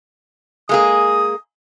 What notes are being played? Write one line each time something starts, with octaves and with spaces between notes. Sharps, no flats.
G#3 A#3 G#4 D#6